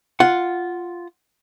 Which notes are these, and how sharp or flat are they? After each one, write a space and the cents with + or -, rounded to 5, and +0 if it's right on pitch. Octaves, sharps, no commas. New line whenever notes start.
F4 +0 F#5 +0